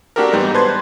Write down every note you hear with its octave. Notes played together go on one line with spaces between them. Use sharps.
A#3 D4 F#4 G4 A4 A#4
E2 G#2 G3 B3 D#4
B4 C5 A5 C6 G6 G#6